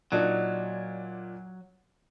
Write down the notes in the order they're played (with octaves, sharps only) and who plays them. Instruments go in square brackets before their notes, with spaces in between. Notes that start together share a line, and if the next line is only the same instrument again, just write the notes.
[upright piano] A#2 D4 D#4 [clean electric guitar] F#3